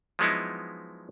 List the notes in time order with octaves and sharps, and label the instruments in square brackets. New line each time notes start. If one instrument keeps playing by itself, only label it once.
[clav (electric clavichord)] F3 F#3 G#3 B3 D#4 E4